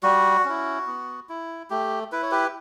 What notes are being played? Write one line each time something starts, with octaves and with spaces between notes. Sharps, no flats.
G3 F#4
C#4 E4
B3
E4
A3 G4
E4 B4
C#5
G4 B4